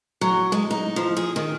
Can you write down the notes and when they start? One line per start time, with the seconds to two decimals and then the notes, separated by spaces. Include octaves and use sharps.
0.21 F#3
0.52 G#3
0.70 D#4
0.96 F3
1.17 G#4
1.36 D#3